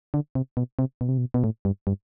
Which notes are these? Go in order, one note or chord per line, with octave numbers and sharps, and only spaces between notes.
D3
C3
B2
C3
B2
C3
B2
B2
A2
G2
G2